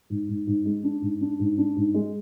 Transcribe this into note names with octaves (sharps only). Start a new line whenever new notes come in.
G#2
G#2
G#2
G#3
D4
G#2
D4
G#2
D4
G#2
G#3